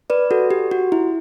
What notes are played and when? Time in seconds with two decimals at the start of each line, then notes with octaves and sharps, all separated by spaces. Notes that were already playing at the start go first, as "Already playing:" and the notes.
0.10 B4 D5
0.31 F#4 A4
0.51 G4
0.71 F#4
0.92 E4